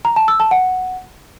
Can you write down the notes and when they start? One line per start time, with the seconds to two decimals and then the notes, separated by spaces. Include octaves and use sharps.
0.05 A#5
0.16 A5
0.28 E6
0.40 A5
0.51 F#5